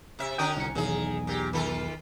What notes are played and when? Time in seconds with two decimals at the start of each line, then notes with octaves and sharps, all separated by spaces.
0.19 C3 E5
0.38 D3 C#4 F#4 G5 D#6
0.57 C2 C#7
0.75 B1 E2 D#3 G#4
1.27 A#2 G4
1.53 D#3 F4 A4